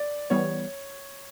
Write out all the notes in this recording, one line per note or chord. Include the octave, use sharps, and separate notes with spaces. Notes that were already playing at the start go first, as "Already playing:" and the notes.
Already playing: D5
E3 G3 B3 C#5